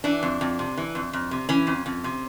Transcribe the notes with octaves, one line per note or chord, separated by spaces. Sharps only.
E3 D4
F2
F2
C3
E3
F2
F2
C3
E3 C#4
F2
F2
C3